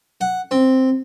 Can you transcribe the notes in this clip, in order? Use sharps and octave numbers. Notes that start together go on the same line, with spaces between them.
F#5
C4